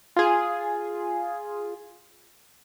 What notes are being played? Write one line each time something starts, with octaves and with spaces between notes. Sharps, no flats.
F4 G#4